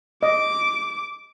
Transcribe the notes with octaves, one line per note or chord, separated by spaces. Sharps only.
D#5 D6